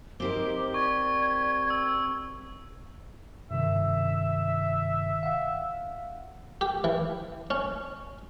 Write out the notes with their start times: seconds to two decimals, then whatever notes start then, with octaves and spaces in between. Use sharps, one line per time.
0.20 C4 D#4 G4 A#4 C5 D6 G7
0.74 D5 C#6 G#6
1.70 E6
3.51 G2 C3 D#3 E5
5.23 F5 F#5
6.61 G4
6.84 E3
7.50 C#4